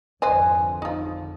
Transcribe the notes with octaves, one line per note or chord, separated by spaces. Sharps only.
G#1 F2 D3 B4 C5 D#5 G#5
F3 D#4